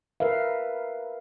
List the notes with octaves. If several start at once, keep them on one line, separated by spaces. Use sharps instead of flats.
A#4 B4 E5 F5